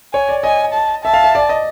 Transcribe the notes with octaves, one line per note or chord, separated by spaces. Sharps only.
C#5 G#5
D5
D#5 G#5
A5
E5 A5
F5
E5
D5
D#5